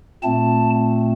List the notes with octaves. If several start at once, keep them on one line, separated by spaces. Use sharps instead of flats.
A#2 A3 C4 A5